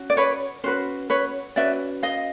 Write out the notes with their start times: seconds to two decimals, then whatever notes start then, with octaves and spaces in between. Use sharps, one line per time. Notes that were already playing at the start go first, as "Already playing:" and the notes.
Already playing: C#4 F#4
0.10 D5
0.17 B4 C#5
0.64 C#4 F#4 B4 C5
1.10 B4 C#5
1.56 C#4 F#4 B4 D5 E5
2.03 D#5 F5